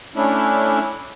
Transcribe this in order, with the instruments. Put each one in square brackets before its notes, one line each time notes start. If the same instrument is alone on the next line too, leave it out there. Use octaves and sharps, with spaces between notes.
[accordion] A3 C#4 D4 E4